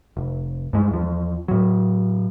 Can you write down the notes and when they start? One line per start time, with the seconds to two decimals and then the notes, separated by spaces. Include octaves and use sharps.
0.17 F1
0.73 G2 G#3
0.91 E2 F3
1.48 A2 F#3